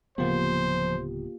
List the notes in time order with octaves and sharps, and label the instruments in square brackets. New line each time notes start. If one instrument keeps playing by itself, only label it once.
[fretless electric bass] D1 C#3 B3 [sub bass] F3 [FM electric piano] A#3 F4 G4 [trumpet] C5